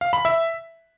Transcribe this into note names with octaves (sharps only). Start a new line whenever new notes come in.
F5
B5
E5